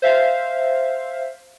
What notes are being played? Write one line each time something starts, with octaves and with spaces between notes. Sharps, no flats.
C5 E5 F5